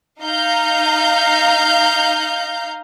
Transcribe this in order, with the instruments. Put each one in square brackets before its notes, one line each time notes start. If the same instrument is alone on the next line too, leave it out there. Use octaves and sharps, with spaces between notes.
[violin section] D#4 F5 A#5 G6